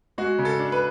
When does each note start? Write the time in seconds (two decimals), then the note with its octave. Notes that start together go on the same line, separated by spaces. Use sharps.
0.18 G#3 F#4
0.39 C#3
0.45 A4
0.59 D4
0.72 B4